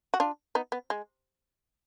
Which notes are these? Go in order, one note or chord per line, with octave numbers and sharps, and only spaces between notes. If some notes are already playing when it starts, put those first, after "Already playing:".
F#4
D4 F4
B3 D#4
B3
G#3